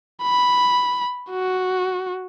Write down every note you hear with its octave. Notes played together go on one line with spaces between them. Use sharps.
B5
F#4